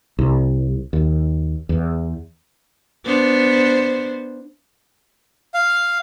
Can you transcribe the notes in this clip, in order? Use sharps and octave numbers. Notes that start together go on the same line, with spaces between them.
C2
D#2
E2
B3 D4 C5
F5